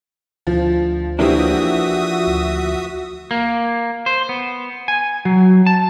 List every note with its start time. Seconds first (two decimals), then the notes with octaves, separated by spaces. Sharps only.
0.47 D2 F3
1.19 E3 F3 A#3 D4 F#4 G4 E5 D#6
2.27 D2
3.31 A#3
4.06 C5
4.29 B3
4.88 G#5
5.25 F#3
5.66 A5